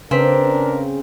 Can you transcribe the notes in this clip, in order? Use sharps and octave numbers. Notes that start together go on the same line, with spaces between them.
C#3 C4 D4 A#4 B4 B6